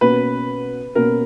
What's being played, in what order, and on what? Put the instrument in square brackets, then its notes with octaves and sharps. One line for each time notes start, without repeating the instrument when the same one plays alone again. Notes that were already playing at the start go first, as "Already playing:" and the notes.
[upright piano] B2 A#3 C#4 F#4 [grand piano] B4
[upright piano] B2 A#3 C#4 F#4 [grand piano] A#4